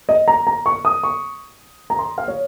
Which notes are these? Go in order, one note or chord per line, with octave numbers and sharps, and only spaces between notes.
D#5
A#5
A#5
C#6
D#6
C#6
A#5
C6
F5
C#5